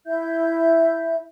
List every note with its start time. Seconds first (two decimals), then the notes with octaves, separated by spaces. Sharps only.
0.07 E4 E5 G6